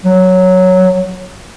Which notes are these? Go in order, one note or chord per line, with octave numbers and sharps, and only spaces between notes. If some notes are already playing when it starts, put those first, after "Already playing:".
F#3